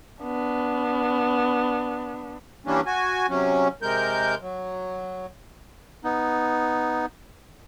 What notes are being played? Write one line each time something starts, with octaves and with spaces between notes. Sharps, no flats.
B3 D4
E3 G3 A#3 C#4 D4
F#4 G#5
C3 F#3 C#4
C3 G#3 A#4 G6
F#3
B3 D#4